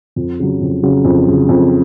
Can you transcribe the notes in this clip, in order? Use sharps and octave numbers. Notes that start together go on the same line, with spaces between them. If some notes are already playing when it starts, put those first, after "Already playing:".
F2
C#3 F#3
F2
C#3 F#3
F2
C#3 F#3
F2